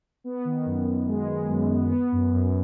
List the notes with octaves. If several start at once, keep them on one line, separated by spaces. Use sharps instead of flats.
B3
D#3
F#2
F#2
G#3
G#3
F#2
B3
B3
F#2
F#2